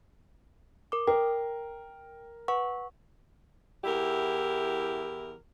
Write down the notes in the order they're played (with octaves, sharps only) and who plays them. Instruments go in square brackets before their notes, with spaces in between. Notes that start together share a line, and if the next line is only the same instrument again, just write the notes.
[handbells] A#4 D6
[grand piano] A#4 [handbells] G5
[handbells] B4 F#5 C#6
[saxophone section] E2 E4 G4 A#4